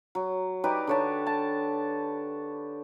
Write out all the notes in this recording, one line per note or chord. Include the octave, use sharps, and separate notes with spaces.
F#3
D#4 G4 B4 D5
D3 C#5 A5
A5